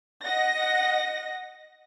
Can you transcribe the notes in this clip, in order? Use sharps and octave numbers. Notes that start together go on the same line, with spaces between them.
D#5 F#5 A#6